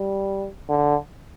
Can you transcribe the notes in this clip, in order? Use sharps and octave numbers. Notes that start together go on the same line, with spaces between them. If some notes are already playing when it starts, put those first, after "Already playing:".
Already playing: G3
D3